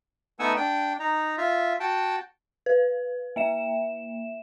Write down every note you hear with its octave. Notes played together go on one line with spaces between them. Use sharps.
A3 B3 D#4 F#5 G#5 E6
D4 G5
D#4 A#5
F4 E5
F#4 G5 A5
B4
A#3 E5 E7